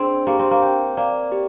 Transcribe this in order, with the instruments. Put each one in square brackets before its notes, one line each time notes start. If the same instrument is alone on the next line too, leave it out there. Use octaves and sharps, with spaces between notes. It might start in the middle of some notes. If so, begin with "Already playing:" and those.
Already playing: [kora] C4 [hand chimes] D4 G#4
[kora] A#3 [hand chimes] G4
[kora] C4
A#3
[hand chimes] G5
[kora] A#3 [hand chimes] D5
[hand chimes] G4